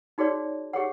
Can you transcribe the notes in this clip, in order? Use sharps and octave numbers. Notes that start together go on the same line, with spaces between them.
D#4 F#4 G#4 C#5 D5
G4 G#4 C#5 F#5